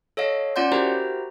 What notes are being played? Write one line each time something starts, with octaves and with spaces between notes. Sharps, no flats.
A4 C#5 D#5 F5
C#4 F4 D5 F#5 C6 G6
E4 F#4 G4 A#4 C5 A#5